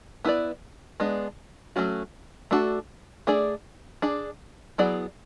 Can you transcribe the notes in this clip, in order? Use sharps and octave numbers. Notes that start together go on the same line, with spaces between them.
B3 E4 B4 D5
G#3 B3 D4
F#3 A3 C#4 F#4
A3 D4 F#4 A4
A3 D4 G#4 D5
D4 G#4 D5
F#3 B3 E4 G#4 D5